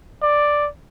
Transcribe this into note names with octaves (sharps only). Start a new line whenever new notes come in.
D5